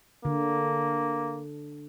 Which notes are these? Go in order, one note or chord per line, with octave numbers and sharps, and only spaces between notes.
D3 A#3